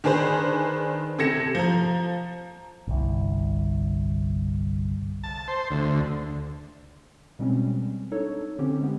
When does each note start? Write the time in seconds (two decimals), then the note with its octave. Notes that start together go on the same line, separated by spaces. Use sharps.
0.04 D#3 D4 G#4 B4 C5
1.19 C3 A4 G#6 A#6 C#7 E7
1.55 F3 A#5
2.87 G1 C2
5.24 A5
5.48 C5
5.71 D2
7.39 B2 G3 G#3 C4 C#4
8.11 D4 D#4 A4 C#5
8.59 D3 C4 C#4 G4
8.80 G#3 B3